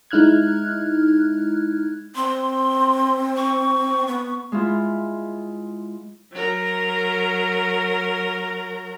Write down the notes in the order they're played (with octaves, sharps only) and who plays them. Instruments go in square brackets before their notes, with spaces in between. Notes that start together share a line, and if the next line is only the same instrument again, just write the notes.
[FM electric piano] G#3 D#4 E4 F6 F#6 G#6
[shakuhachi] C4 [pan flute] C6
[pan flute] C#6
[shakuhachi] B3
[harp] G#3 E4 F4
[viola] F#3 A#4